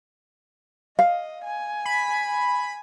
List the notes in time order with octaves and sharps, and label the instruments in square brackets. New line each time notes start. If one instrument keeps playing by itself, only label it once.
[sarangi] D#5 [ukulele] F5
[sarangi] G#5
[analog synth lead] B5